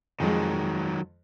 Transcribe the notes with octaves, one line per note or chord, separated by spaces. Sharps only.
F2 D#3 F#3 G#3